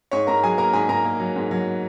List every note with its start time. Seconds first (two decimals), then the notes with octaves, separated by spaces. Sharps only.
0.11 G#2 C#5 C#6
0.27 G#2 A#4 A#5
0.43 F#3 G#4 G#5
0.58 A#3 A#4 A#5
0.73 G#2 G#4 G#5
0.89 G#2 A#4 A#5
1.04 A#3
1.19 F#3
1.36 G#2
1.51 F#3